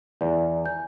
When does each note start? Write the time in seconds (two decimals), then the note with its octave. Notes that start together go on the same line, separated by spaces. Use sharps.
0.21 E2 D5
0.64 G#5 G6